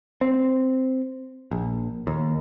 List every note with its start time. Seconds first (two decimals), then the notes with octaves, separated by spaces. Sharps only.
0.21 C4
1.51 A#1
2.07 D#2